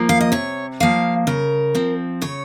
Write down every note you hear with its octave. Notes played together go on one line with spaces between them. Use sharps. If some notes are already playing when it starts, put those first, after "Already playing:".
Already playing: F3 A#3
F5
D#5
C3 C#5
F3 A#3 F5
C#3 A#4
F3 C4
C#3 C#5